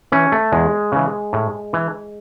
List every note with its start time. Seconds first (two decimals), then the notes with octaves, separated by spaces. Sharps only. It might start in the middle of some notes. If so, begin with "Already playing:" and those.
0.12 E3 C#4
0.32 A3
0.52 E2 G#3
0.92 C#3 E3
1.33 A2
1.73 E3